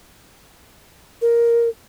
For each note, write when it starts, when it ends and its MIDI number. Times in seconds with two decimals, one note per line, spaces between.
1.22 1.69 70